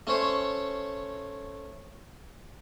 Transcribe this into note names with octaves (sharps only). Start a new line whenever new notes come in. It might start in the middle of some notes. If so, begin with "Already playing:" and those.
A3 C#4 C5 C#5